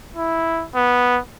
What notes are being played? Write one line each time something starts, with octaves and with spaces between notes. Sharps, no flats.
E4
B3